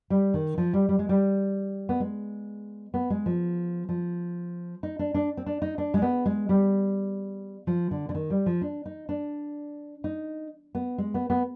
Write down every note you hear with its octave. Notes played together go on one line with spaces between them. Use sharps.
G3
D#3
F3
G3
G3
G#3
G3
B3
G#3
B3
G#3
F3
F3
D#4
D4
D4
C4
D4
D#4
D4
G#3
B3
G#3
G3
F3
D3
D3
D#3
G3
F3
D4
D#4
D4
D#4
B3
G#3
B3
B3